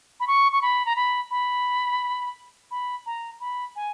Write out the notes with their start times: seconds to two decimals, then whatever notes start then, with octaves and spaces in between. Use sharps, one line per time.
0.20 B5
0.27 C#6
0.52 C#6
0.62 B5
0.86 A#5
0.96 B5
1.31 B5
2.71 B5
3.06 A#5
3.40 B5
3.76 G#5